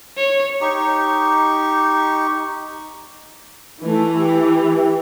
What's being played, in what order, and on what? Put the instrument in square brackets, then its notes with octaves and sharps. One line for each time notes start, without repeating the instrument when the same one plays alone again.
[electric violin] C#5
[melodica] D#4 G4 C#6
[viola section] E3 [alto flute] A3
[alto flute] G4